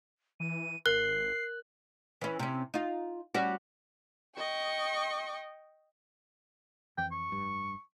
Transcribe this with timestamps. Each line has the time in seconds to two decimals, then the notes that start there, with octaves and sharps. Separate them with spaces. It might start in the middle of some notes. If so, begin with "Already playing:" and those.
0.40 E3 D#7
0.86 G#1 A#4 F#6 C7
2.21 E3 C#4
2.39 C3 C#4
2.74 D#4 F4
3.34 G3 C#4 F#4
4.37 D#5 G5 C#6
6.98 F2 E3 G5
7.12 C#6
7.29 F1 G2